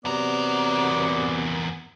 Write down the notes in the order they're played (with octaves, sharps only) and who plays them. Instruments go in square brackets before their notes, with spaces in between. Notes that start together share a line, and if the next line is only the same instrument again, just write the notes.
[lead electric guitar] E2 A#4 [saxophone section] C3 F#3 B3 [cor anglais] D5